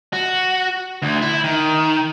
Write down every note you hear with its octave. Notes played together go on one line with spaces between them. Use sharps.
F#4
D2
E4
D#3